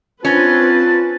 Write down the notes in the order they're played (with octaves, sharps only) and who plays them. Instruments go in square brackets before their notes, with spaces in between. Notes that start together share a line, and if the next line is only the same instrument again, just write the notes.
[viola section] C4 B4 [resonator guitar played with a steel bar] C#4 [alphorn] F4 [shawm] A5